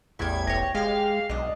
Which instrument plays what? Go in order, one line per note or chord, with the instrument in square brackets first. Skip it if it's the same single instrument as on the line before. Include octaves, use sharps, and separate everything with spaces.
[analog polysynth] A1 E2 G#6 [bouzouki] G3 E4
[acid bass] E1 [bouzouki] G4 C#5 [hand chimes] A#6
[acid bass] G#3 [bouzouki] G4 [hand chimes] G#4 [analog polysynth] F5
[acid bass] B1 [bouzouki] D4 D#5